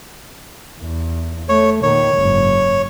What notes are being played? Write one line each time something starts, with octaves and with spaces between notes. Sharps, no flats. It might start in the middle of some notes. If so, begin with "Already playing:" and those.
E2
A3 C#5
A#2 D#3 C#5
F#1 G#2